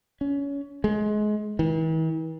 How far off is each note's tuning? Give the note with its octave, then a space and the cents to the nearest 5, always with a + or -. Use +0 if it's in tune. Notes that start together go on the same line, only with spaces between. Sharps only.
C#4 +25
G#3 +25
E3 -45